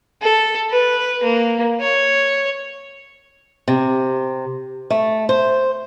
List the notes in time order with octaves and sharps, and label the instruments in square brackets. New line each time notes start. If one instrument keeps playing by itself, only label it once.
[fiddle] A4
B4
A#3
C#5
[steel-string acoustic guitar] C3
A3
C5